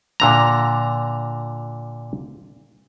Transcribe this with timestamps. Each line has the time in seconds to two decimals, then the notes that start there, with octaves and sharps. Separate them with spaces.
0.20 A#2 D3 A#5